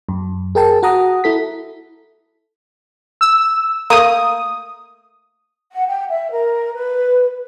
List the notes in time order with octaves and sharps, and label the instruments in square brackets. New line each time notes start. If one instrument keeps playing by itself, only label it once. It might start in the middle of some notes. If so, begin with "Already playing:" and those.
[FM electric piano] F#2
G#4 A#4 G5 A5
F#4 F#5 A#5 D#6
E4 A4 B6
[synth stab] E6
[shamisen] A3 A#3 [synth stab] D#6
[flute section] F#5
G5
E5
A#4
B4